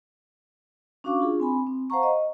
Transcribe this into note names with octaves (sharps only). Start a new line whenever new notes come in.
C#4 D4 F#4 F5 C#6 D6
D4 F4 G#4
C4 G#5 B5
C4
C5 F5 F#5 A5 A#5 C#6
D#5